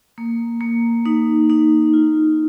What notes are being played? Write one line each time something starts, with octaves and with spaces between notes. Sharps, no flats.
A#3
A#3
D#4
D#4
F4